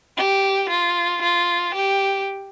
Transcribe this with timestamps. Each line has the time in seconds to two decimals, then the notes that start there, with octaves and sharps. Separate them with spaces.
0.17 G4
0.70 F4
1.22 F4
1.75 G4